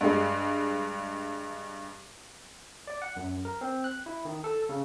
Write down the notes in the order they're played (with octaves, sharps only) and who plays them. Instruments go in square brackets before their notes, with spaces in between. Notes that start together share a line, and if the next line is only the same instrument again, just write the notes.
[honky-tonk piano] G2 G#3
[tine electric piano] D5
F#5
F#2
A#4
C4
F#6
E4
D#3
A4
C#3